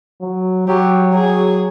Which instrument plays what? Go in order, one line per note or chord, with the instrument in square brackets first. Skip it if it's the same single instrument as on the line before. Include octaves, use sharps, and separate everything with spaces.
[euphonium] F#3
[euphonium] F#3 [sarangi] G4
[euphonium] F#3 [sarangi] G#4